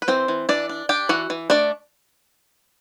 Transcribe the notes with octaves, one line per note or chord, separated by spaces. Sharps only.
B4
E3 C4 C5
E3
E3 D4 D5
D4
D4 G4 G5
E3 F#4 F#5
E3
A3 D4 D5